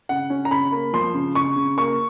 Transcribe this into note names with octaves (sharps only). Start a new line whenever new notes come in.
C#3 F#5
C#4
A#5
C#3 B5
A#3
F3 C6
C#3
C#3 C#6
C#3
A#3 C#6